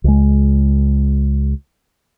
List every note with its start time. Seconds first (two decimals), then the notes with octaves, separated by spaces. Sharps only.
0.04 C#2 G#3